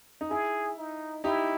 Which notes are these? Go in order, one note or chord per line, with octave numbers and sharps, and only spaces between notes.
D#4
E4 G#4
D#4
D#4 E4 G4